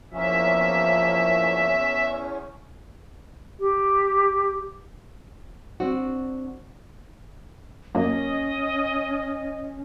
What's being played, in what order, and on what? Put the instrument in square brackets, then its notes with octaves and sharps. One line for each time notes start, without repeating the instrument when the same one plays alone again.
[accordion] E2 C#4 [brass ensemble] F3 A#3 [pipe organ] E5
[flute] G4
[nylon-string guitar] C4 D4 F#4
[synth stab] F#2 A#3 [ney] C#4 [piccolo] D#5